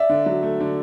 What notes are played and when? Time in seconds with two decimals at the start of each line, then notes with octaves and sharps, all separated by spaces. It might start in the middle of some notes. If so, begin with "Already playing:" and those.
Already playing: D5 E5
0.09 D3
0.26 F#3
0.43 A3
0.60 D3